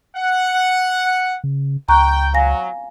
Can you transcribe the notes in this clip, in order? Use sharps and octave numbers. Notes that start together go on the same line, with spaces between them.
F#5
C#3
C#2 G5 A#5 C#6 F#6
F#3 F5 G#5 A#6